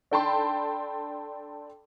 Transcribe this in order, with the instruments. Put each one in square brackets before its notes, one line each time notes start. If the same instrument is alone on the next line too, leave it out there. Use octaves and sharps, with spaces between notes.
[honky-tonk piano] D4 A4 G5 A5 B5 C6